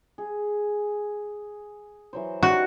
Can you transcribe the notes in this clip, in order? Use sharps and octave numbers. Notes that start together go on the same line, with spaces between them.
G#4
E3 F#3 C5
D#4 F#4 G4 D5